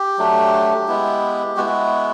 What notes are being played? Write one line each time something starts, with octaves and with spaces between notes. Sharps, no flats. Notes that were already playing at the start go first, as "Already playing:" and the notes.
Already playing: G4
F#3 A3 D4
G#3 B3 E4
G#3 B3 E4 F#4